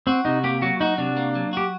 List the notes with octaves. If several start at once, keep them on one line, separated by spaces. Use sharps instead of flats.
C4 F#4
C3 D#4
A#3 G4
F#3 F#4
D#4 F#4
C3 D4
A#3
F#3
F#4 G4